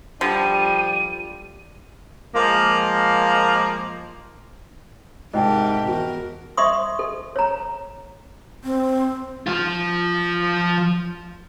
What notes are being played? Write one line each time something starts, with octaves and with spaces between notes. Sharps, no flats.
D3 F3 G3 D#7
F3 G#3 A#3
G#2 C3 G4 A#4 D#5 G5 A5
E2 F#4 A#4
D#5 E5 C6 C#6 D#6
A4
C#5 A#5
C4
F3 F4